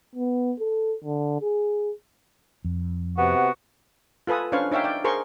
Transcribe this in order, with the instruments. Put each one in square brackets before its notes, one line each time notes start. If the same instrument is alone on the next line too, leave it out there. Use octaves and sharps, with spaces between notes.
[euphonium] B3
A4
D3
G#4
[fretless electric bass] F2
[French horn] C3 [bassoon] B3 [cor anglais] F#4
[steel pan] F4 A4 B4 G#5 D#6
C#4 D4 B4 C5 F5 C#6
D#4 C#5 E5 F5 G5
D5 G5
G#4 A#4 C5 C6 C#6